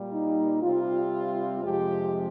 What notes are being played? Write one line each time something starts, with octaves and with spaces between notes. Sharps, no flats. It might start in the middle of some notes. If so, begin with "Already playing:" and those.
Already playing: A#2 G3 A#3
D#4
C3 G3 C4 F4
F2 C3 F3 G#3 G4